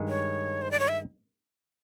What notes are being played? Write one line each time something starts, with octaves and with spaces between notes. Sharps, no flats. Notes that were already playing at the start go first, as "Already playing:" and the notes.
Already playing: G2 D#3 G#3
C#5
C5
D5
C#5
E5